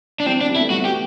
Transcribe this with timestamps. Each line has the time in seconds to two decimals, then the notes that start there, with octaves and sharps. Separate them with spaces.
0.20 D4
0.26 E3 G3 C4
0.41 C4 D4
0.48 G3 B3
0.56 E4
0.60 A3
0.70 G3 B3 F#4
0.85 G4